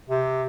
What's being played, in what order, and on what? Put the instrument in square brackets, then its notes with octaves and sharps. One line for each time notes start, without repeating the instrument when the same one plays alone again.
[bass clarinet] C3